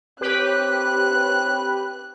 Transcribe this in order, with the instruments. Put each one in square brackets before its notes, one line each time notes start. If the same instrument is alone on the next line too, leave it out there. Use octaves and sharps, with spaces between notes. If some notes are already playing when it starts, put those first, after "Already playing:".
[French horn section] C4 C#5 [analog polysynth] G4 B4 [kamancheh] F#6